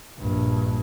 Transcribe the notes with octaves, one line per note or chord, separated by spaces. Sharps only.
A#1 G2